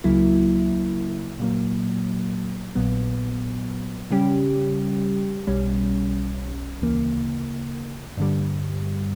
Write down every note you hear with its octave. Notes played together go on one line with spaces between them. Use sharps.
C#2 C#3 F#3 A#3 E4
A#2 F#3 A#3
A#1 A#2 F#3 B3
C#3 G3 C#4 G4
B1 B2 G3 C#4
D2 C#3 E3 A#3
G2 D3 G3